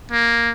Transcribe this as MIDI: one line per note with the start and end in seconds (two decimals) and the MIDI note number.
0.12 0.51 58